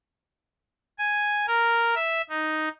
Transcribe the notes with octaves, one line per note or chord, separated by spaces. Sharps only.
G#5
A#4
E5
D#4